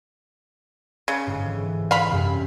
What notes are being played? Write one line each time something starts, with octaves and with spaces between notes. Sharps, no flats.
C#3 C#6
G1 G#2
E3
F5 B5
C2 F#2